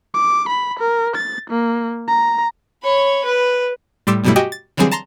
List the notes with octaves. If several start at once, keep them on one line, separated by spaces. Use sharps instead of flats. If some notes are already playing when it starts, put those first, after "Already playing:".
D6
B5
A#4
A6
A#3
A#5
C#5 B5
B4
A2 G3 C6 D6 E6
G2 B2 F#3 G3 A3 E4
F#4 G4 D#5 G5 G#5
A6
D3 E3 F#3 G3 C4 G#4
A5 A#5 C6 A#6